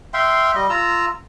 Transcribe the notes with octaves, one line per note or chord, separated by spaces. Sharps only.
E5 F5 G5 C6
G3 D#5
F4 A#5 E6